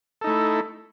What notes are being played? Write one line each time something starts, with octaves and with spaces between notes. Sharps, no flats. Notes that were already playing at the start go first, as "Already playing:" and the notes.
A3 D#4 E4 A4